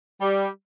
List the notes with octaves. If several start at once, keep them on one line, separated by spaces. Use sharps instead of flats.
G3